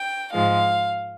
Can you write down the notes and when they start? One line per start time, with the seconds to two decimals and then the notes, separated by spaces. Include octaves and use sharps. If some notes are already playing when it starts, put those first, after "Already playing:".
Already playing: G5
0.33 G#2 F3 G#3 F5